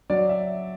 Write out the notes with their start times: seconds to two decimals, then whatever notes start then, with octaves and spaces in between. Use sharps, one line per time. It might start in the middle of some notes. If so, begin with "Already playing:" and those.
0.10 F#3 D5
0.29 E5